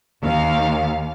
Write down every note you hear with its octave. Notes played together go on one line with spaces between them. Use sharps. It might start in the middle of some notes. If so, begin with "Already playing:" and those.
D#2 F5